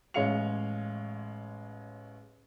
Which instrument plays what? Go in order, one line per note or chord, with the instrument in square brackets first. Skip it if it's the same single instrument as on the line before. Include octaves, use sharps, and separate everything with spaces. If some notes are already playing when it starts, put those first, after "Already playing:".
[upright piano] A1 G#3 C#5 F5 C#7 F7